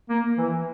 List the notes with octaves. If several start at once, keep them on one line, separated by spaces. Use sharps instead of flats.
A#3
E3